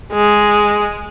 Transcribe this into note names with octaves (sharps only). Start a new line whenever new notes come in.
G#3